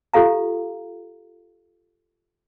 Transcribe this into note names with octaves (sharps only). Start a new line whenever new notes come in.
F4 G4 A4 F5 A#5